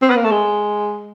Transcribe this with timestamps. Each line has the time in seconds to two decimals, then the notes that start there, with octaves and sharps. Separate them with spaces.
0.02 C4
0.10 B3
0.16 A#3
0.24 A3
0.31 G#3